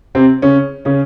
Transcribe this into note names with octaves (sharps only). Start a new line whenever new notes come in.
C3 C4
C#3 C#4
C#3 C#4